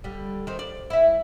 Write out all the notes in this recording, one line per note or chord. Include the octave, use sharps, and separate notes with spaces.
D3 G3
D#3 C4
D5
E4 E5